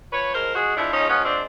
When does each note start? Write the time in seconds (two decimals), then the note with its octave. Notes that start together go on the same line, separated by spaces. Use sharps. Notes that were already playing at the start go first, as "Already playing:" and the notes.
0.12 F3 B4 C#5
0.34 G#3 A#4 C5
0.55 G#3 F#4 G#4
0.77 F3 D4 E4
0.93 C#4 D#4
0.98 G#3
1.09 B3 C#4
1.20 F3
1.25 C4 D4